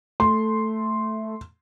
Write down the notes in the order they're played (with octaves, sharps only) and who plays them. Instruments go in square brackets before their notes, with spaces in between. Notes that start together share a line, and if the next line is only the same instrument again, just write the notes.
[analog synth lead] A3 [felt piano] C6